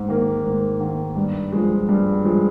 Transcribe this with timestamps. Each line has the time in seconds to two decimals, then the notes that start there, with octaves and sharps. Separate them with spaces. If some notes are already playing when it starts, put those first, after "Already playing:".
Already playing: G#2
0.08 D#3 A#3
0.44 G#2
0.80 D#3 A#3
1.16 G2
1.52 F3 G#3
1.89 G2
2.25 F3 G#3